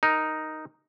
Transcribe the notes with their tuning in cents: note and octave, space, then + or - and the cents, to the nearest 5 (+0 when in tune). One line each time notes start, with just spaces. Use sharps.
D#4 +0 A#4 +0